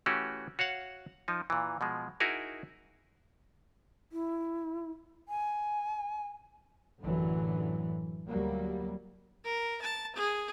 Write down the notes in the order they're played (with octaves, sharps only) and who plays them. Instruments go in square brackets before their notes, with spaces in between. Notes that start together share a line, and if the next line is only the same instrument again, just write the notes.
[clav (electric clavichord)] E3 A3 C#4 F#4 G4
F#4 C#5 F5 F#5
F3 D#4
A#2 E3
B2 F3 G#3
D#4 E4 F#4 G#4 A#4
[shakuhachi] E4
G#5
[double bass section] A1 F#2 D3 E3 F#3
D2 F#3 G3 A#3
[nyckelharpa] A#4
A5
G#4